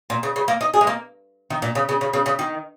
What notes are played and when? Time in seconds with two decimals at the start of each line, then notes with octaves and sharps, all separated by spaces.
0.10 A#2
0.23 C#3
0.36 C#3
0.48 A#3
0.61 D#4
0.74 G#4
0.81 G#3
0.87 A#3
1.50 D#3
1.62 A#2
1.75 C#3
1.89 C#3
2.01 C#3
2.13 C#3
2.26 C#3
2.39 D#3